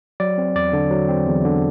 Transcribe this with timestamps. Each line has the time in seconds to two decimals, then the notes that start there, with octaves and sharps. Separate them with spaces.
0.20 F#3 D5
0.38 C4
0.56 E2 D5
0.73 D3
0.91 F#3
1.09 C4
1.27 E2
1.44 D3